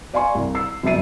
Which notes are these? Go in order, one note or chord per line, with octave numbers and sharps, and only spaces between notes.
D5 F5 G#5 C6 C#6
C2
E6 C7
G1 C2 F#2 E5 C7 D#7